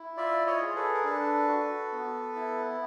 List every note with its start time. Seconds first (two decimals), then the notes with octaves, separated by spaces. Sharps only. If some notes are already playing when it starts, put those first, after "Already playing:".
Already playing: E4
0.17 F4 D5 E5
0.46 C#5 D#5
0.62 G#4
0.75 A4 B4
0.94 A#4
1.04 D4 A4 B4
1.48 F#4
1.92 B3
2.36 E4